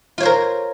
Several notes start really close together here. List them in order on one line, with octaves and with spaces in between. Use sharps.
F4 C#5 C5 A#4